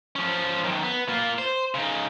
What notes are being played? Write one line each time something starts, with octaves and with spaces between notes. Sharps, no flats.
F3 C#4
F#2 D#3
B3
A#3 F4
C5
C#3 D#4